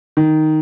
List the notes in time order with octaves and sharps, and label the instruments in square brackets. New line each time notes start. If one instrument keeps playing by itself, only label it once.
[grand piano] D#3